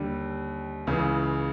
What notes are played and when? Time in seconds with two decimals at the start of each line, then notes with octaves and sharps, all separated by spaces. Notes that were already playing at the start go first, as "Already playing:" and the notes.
Already playing: D#2 D3 G3
0.87 C#2 C#3 E3